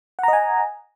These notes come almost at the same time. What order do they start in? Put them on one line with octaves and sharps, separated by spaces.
F#5 A#5 D#5 G#5